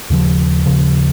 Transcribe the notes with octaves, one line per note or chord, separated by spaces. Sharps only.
D#2 C#3 F3
D#2 C#3 F3